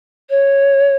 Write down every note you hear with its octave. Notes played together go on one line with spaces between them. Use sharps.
C#5